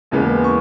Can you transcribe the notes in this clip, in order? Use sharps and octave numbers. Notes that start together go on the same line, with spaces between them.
D#2 C#3 E3 G#3 B3
C#6